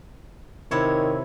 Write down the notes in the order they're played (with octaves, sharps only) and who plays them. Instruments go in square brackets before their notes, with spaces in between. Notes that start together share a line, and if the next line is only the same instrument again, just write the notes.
[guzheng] C3 E4 C#5 [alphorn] D#3